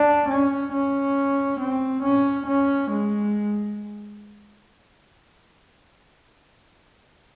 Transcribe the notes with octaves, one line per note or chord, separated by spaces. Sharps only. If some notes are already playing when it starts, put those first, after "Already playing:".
Already playing: D4
C#4
C#4
C4
C#4
C#4
G#3